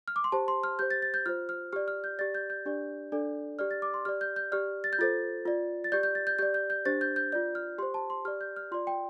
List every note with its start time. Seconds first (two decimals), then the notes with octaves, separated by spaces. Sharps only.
0.08 F6
0.16 D6
0.24 C6
0.32 G4 C5 A5
0.48 C6
0.64 F6
0.79 G4 C5 G6
0.91 A6
1.02 A6
1.14 G6
1.26 F4 C5 F6
1.49 F6
1.73 G4 D5 F6
1.88 F6
2.04 G6
2.19 G4 D5 A6
2.35 G6
2.50 G6
2.66 D4 G4 D5
3.12 D4 A4 D5
3.59 G4 D5 F6
3.71 A6
3.82 D6
3.94 C6
4.05 G4 D5 F6
4.21 G6
4.36 G6
4.52 G4 D5 F6
4.84 A6
4.93 G6
4.99 F4 A4 C5 A6
5.45 F4 D5
5.84 A6
5.92 G4 D5 G6
6.03 G6
6.15 A6
6.27 G6
6.39 G4 D5 G6
6.54 G6
6.70 G6
6.85 D4 G4 C5 A6
7.01 G6
7.16 G6
7.32 F4 D5 G6
7.55 F6
7.78 G4 C5 C6
7.94 A5
8.10 C6
8.25 G4 D5 F6
8.41 G6
8.56 F6
8.72 F4 D5 C6
8.87 G5